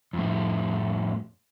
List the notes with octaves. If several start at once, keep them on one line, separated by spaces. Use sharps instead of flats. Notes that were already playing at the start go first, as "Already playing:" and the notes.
F2 A2